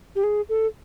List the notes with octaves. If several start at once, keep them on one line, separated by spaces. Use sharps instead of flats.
G4
G#4
A4